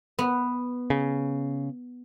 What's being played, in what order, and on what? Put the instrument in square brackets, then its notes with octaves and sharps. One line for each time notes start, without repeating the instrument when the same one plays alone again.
[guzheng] B3
[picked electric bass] C#3